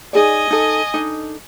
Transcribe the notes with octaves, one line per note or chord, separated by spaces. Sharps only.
D#4 G#4 D5 D#5 G#5
D#4 A4
D4 D#4 A4